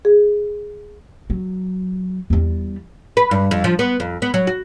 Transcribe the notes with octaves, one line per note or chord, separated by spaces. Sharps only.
G#4
F#3
E2 G3
B4
G2
F2
F3
B3
F2
B3
F#3
F#4